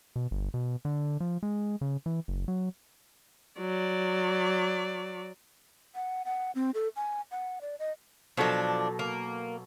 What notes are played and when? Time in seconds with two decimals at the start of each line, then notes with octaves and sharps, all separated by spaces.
0.16 B2
0.31 G1
0.54 B2
0.85 D3
1.20 F3
1.43 G#3
1.81 C#3
2.06 E3
2.28 F#1
2.48 F#3
3.59 F#3 D5
5.95 F#5
6.25 F#5
6.55 C4
6.74 A4
6.96 G#5
7.31 F#5
7.61 D5
7.79 D#5
8.37 B2 F3 F#3 D4 A4
8.99 A#3